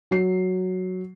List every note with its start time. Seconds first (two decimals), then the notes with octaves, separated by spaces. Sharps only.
0.11 F#3 C7